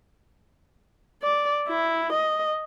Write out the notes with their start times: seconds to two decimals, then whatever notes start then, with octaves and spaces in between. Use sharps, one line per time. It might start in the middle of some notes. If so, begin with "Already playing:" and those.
1.23 D5
1.68 E4
2.14 D#5